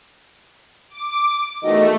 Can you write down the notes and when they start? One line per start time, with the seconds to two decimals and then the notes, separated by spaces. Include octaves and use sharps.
0.90 D6
1.63 E2 D#3 A3 F#4 D#5